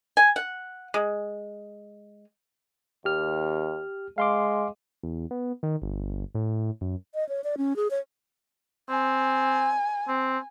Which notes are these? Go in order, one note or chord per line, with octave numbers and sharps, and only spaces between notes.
G#5
F#5
G#3
D#2 G4 F6
G#3 F5 C6 D6
E2
B3
D#3
G1
A2
F#2
D#5
C#5
D5
C#4
G#4
C#5
C4 G#5
C4